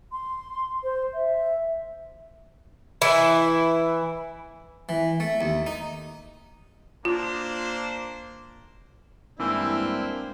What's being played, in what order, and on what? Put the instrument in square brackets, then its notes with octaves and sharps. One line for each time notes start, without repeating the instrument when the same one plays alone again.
[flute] C6
C5
E5
[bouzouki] E3 E4
[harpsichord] E3
A3
D#2
D#4
[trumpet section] A#3 D4 C5 [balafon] F4
[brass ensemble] G2 D4 E4 [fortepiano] E3 [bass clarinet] G#3 [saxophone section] A#3 C4